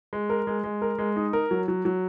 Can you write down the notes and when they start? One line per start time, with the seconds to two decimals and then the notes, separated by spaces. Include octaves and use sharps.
0.13 G#3
0.30 A#4
0.47 G#3
0.64 G#3
0.82 A#4
0.98 G#3
1.16 D#4
1.33 A#4
1.51 F#3
1.68 F#3
1.85 F#3